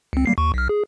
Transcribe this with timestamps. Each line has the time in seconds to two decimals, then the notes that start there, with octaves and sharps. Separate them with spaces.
0.13 C#2 C4
0.26 G3 A#3 C7
0.38 D#2 C#6
0.54 B1 F6
0.69 G#4